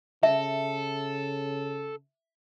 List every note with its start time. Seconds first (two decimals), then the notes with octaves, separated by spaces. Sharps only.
0.23 C#3 A4 E5